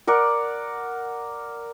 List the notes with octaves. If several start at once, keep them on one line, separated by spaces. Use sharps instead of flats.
A#4 D5 F#5